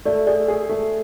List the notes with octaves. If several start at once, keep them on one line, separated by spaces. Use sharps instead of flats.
A3 D5
G#4 D5
G#4
A3